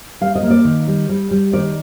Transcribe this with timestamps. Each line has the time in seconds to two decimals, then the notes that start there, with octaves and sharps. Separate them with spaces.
0.21 G3 F5
0.35 D#5
0.43 A#3
0.51 D5
0.65 D#3
0.87 G3
1.09 G3
1.31 G3
1.53 D#3 D5